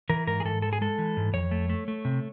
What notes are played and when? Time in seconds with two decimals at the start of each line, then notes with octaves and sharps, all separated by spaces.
0.10 E3 A#4
0.27 G#2 A#4
0.40 G#4
0.45 G#2 A4
0.62 G#3 A4
0.73 G#4
0.81 G#3 A4
0.98 E3
1.17 G#2
1.33 F2 C#5
1.51 A3
1.69 A3
1.88 A3
2.05 C3